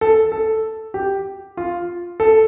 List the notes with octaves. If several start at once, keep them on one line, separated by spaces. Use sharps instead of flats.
A4
A4
G4
F4
A4